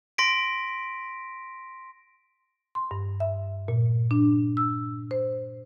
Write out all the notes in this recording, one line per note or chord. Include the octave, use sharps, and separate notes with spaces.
C6 A#6 B6 D7
C6
G2
E5
A#2
D4
E6
C5